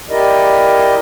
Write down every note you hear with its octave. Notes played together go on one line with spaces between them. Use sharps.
E4 G4 A#4 D5 D#5